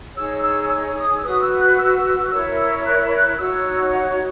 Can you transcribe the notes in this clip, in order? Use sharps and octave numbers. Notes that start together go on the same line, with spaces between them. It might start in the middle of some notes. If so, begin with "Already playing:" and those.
D#4 G#4 C#5 E6
E6
E6
D#6
E6
F#4 B4 D#6
E6
F#6
E6
E4 A#4 C#5 E6
F#6
D#4 F#4 C#5 E6
F#5